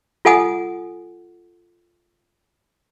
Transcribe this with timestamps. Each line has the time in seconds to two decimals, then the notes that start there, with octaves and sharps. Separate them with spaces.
0.25 F4 A4 F#5 G#5 D#6